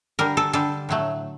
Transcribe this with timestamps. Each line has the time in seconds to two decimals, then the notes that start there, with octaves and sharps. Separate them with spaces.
0.19 D3 G3 A#4
0.37 A4
0.53 D3 G3 A4
0.89 A2 F#3 A3